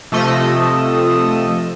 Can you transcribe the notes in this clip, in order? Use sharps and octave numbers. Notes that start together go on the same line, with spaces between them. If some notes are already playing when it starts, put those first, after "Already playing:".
C3 F3 A3 D#5 E6